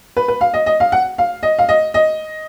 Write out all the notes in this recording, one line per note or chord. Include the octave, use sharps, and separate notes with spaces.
B4
B4
F5
D#5
D#5
F5
F#5
F5
D#5
F5
D#5
D#5